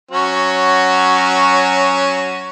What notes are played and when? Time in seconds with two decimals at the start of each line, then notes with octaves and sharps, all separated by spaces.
0.11 F#3 C#4 F#4